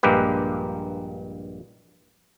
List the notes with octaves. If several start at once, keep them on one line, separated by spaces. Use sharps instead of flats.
A#1 G2 G#3 A#3 G4 B4